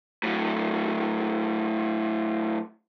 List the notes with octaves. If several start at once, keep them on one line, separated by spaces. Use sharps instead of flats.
A2 F#3